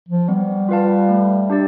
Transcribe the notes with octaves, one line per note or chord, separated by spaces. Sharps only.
F3
G3 B3
F4 B4 F5 A5
A3
D4 G4 D5